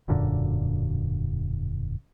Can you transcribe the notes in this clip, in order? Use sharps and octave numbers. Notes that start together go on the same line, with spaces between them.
E1 F#2 A#2 D3